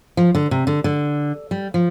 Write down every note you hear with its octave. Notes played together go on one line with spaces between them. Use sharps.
F3
D3
C3
D3
D3
G3
F3